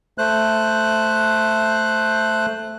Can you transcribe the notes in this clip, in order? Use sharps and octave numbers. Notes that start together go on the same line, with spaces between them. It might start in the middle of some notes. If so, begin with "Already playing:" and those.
A3 C5 F#6